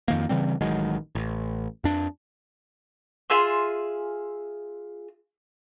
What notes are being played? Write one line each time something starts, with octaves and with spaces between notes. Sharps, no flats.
F2 D#3 A#3
C#3 E3 G3 C4
A1 D#3 F#3 G#3
A1
F2 D4
F4 G#4 E5 C6